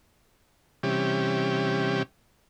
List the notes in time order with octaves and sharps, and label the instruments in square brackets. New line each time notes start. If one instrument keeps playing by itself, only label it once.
[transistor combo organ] C3 E3 G3 C#4 G4